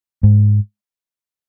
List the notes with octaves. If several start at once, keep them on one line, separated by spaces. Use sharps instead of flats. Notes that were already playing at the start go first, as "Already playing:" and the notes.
G#2